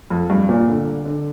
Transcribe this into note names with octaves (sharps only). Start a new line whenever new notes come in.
F2
G2
A#2
D3
D3